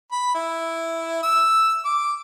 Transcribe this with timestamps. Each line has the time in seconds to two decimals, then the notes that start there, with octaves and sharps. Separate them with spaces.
0.12 B5
0.35 E4
1.23 E6
1.85 D6